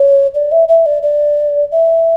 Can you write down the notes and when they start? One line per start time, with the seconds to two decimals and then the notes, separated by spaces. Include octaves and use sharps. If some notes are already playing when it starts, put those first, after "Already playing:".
Already playing: C#5
0.34 D5
0.52 E5
0.68 E5
0.86 D5
1.03 D5
1.72 E5